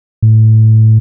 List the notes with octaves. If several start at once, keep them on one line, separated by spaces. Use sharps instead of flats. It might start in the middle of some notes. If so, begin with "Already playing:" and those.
A2